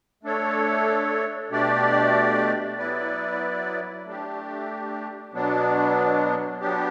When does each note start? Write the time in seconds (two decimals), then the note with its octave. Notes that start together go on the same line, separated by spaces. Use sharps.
0.23 A3 D4 A4 C#5
1.50 B2 A3 D4 G4 D5
2.78 F#3 B3 E4 B4 D5
4.05 A3 D4 G4
5.33 B2 F#3 B3 D4
6.61 F#3 B3 D4 G4